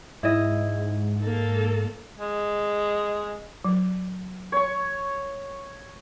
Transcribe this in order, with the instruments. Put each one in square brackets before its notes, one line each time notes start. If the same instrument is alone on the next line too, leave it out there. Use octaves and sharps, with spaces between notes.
[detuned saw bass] G#2 [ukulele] E4 D#5
[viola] A#3 A4
[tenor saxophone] G#3
[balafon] F#3
[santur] C#5 C#6